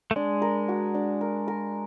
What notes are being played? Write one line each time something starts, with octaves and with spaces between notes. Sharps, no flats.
A3
G#3 D4
A#4
F#4
D4
A#4
A#4